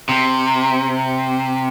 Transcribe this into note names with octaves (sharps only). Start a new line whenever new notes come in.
C3